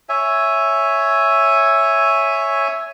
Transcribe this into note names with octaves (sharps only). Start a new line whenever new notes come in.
C#5 E5 G#5